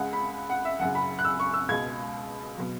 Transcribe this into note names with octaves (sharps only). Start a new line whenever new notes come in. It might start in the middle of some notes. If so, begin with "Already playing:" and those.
Already playing: C#2 C#3 G#3 F#5
B5
F#5
E5
F#1 F#2 C#3 F#5
B5
F#6
E6
C#6
E6
C#2 B2 G#3 G#6
B2 F#3